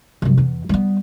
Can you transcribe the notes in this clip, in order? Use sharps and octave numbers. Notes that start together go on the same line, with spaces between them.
C2 F#2
E2
G3 B3